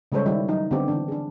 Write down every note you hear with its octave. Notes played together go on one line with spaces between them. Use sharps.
C#3 G3 G#3 A4 C5 C#5
D#3 G3 E4
F#3 D#4
D3 B3 C4 G4
D3 E3 D4
D4 G#4